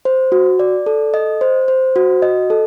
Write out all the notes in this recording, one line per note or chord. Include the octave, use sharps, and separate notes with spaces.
C5
F#4
D5
A4
D#5
C5
C5
F#4
D#5
A4